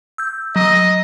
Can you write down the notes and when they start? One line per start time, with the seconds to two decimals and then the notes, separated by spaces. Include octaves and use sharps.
0.18 E6 G6
0.56 F#3 D#5